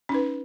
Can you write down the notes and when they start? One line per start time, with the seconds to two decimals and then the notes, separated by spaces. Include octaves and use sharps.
0.09 C#4
0.12 D#4
0.14 B4